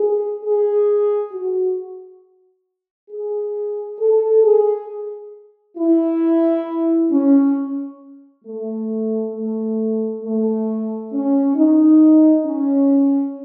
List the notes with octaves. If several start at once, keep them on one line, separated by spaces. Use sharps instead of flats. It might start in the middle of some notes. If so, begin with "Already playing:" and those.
Already playing: G#4
G#4
F#4
G#4
A4
G#4
E4
C#4
A3
A3
A3
C#4
D#4
C#4